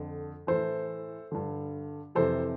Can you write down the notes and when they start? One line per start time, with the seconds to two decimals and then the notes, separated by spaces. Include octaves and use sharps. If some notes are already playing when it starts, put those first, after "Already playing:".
Already playing: F2 D3
0.47 A2 E3 A4 C5
1.32 G2 D3
2.15 F2 C3 E3 A4 C5